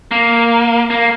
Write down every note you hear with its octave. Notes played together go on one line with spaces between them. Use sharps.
A#3
A#3